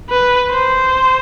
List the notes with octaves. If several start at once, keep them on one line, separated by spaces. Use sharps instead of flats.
B4
C5